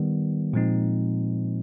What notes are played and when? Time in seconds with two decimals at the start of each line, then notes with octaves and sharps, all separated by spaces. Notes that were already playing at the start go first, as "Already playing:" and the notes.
Already playing: D#3 G3 B3
0.53 A#2 F3 G#3 C4 D#4